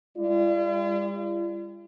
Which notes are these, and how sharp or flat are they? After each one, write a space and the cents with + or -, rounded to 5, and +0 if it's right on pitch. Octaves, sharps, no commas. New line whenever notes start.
G3 +40 F4 -45 D5 +10